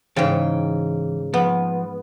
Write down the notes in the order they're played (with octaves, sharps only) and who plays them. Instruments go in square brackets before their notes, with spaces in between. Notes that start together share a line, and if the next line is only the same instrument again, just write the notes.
[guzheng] G#2 C#3 [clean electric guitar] E3 G5
[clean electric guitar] F3 [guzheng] B3